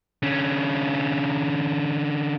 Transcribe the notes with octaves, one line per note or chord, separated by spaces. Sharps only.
D3 C#4